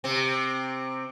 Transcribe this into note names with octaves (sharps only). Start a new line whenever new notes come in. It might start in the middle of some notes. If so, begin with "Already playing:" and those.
C3 C4